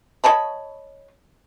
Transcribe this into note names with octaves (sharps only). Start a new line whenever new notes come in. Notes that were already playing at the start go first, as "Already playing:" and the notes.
C#5 D#5 A5 B5